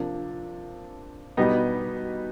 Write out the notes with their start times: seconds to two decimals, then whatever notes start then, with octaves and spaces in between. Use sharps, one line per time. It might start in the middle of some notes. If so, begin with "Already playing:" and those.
Already playing: C3 F3 A#3 D4
1.37 B2 G3 B3 D#4 G4